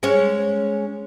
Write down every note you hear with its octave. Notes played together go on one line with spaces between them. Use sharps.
G#3 C#4 C#5